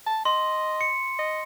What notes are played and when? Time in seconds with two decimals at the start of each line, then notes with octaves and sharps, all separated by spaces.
0.07 A5
0.25 D#5 C6
0.81 C#7
1.19 D#5